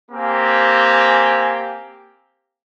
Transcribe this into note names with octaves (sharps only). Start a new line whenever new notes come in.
A#3 C4 G4 G#5